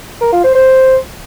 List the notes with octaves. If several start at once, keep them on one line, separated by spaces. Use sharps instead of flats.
A#4
F4
C5
C5